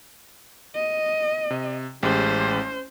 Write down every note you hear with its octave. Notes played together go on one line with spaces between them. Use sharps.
D#5
C3
A1 G#3 C#4 G4 C5